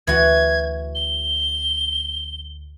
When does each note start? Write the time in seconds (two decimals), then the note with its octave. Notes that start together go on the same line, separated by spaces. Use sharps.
0.07 D2 E3 F#4 G#6
0.95 G7